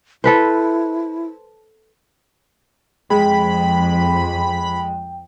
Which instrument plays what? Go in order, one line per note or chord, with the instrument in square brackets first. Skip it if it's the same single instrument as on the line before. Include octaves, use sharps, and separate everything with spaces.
[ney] E4 [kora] A4 B4 C5
[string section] F2 [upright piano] G#3 [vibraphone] G5 [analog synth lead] B5